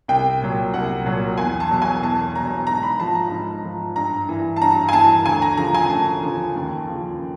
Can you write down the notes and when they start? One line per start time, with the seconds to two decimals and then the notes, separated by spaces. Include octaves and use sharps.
0.08 C2 G5
0.42 A#2 F#3
0.74 C2 F#5
1.06 A#2 F#3
1.37 E2 G#5
1.60 A5
1.71 B2 F#3
1.82 G#5
2.03 E2 A5
2.35 B2 F#3 A#5
2.67 G#2 A#5
2.83 B5
3.00 F3 A5
3.15 A#5
3.31 G#2
3.64 F3
3.96 G2 A#5
4.29 E3
4.56 A5
4.61 G2 A#5
4.89 G#5
4.93 E3 A5
5.26 D2 G#5
5.42 A#5
5.57 C#3 F3 A#5
5.74 G#5
5.90 D2 A5
6.22 C#3 F3
6.55 D#2
6.87 C#3 F3